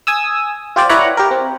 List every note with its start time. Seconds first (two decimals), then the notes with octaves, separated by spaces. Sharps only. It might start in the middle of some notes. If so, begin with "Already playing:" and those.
0.07 G#5 D#6 E6
0.76 F4 G4 C5 D5
0.89 E4 B4 C#5 D5 F#5 A#5
1.17 G4 A#4
1.31 C4